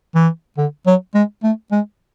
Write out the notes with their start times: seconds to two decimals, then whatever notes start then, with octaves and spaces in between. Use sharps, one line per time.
0.15 E3
0.58 D3
0.87 F#3
1.15 G#3
1.43 A3
1.72 G#3